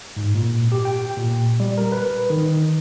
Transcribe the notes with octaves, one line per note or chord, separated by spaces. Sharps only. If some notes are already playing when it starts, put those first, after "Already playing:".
G#2
A#2
G4
G5
A#2
G3
A#4
B4
D#3